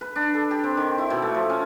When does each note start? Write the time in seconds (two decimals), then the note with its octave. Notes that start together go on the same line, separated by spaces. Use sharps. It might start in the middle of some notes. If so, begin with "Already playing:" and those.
0.01 B4
0.16 D4
0.34 A4
0.51 G4
0.63 C4
0.77 D#3
0.98 E4
1.10 B2
1.22 A3
1.35 F3
1.50 C#4